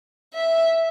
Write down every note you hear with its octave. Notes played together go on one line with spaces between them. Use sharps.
E5